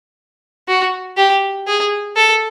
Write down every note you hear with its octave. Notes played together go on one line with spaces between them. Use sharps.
F#4
G4
G#4
A4